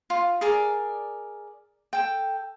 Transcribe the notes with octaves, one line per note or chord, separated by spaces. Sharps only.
F4
G#4 A#4 D5
A4 G5